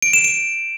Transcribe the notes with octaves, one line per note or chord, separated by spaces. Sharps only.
D7
E7
D7